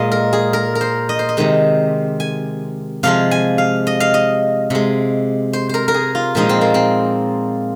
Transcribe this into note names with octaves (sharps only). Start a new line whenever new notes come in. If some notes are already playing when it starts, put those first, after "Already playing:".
Already playing: A#2 G#3 D#5 F5
A#4
G#4
A#4
A#4
C5
D#5
C5
D#5
C3 D#3 G#3
G#5
C3 F3 G#3 F5
G#5
F5
D#5
F5
D#5
C3 G#3
C5
A#4 C5
A#4
G#4
F4
A#2 F3 G#3 D#4
C4
A#3
C4